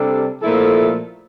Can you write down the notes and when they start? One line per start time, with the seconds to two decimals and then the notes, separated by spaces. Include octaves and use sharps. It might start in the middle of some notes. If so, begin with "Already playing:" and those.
Already playing: C3 G3 D4 A4
0.41 A#2 F3 A3 E4 A4